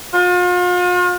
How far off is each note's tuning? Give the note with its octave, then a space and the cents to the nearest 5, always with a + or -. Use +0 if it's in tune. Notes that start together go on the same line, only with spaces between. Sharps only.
F4 +40